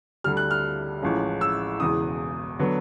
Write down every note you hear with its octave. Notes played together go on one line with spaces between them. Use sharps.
D2 D3 G3 F6
F#6
F6
A1 A2 F3 G#3 C#4
E6
E1 E2 C#3 D#6
D3 F#3 B3